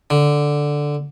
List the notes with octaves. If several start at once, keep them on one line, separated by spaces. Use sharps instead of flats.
D3